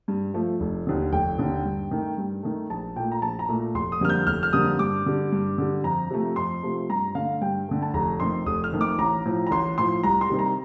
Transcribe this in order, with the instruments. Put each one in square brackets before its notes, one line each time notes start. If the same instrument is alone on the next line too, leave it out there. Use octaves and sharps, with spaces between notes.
[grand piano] G2
F3 A3
F1
D#2 D3
F1 G5
D#2 D3
G2
D#3 A3
G2
D#3 A3
A#1 A5
A#2 A3 G5
A#5
A#1 A5
A#5
A#2 A3
F1 C6
D#6
F2 D3 G3 A#3 F6
G6
F1 F6
F6
F2 D3 G3 A#3 D#6
G2 D6
D3 G3
G2
D3 G3
F2 A#5
C3 F3 A3
F2 C6
C3 F3 A3
G2 A#5
D3 A3 F5
G2 G5
D3 A3
A5
F1 A#5
F2 D#3 A3 C6
F1 D#6
F6
F2 D#3 A3
D6
A1 A#5
A2 F3
A#5
A1 C6
A2 F3 C6
C2 A#5
C6
C3 D#3 G3
A#5